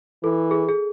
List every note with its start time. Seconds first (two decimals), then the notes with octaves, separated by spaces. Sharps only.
0.24 E3 A4
0.51 G#4
0.69 G#4